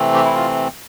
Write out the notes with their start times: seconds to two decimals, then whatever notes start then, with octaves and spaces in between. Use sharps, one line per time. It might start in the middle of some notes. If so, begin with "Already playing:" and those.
Already playing: C3 E3 A3 C4
0.14 G4
0.25 E4
0.35 F4